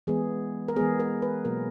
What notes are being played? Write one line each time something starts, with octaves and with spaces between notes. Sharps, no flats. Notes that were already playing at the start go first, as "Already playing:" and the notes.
E3 G#3 B3 G#4
A#4
E3 G#3 B3 G#4
A#4
B4
B2 F#3 A#3 A#4